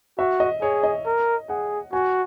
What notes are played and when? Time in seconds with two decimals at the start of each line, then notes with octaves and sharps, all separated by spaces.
0.19 F#4 E5
0.40 D#5
0.62 G#4 C#5
0.83 D#5
1.06 A#4
1.49 G#4 F#5
1.92 F#4 G#5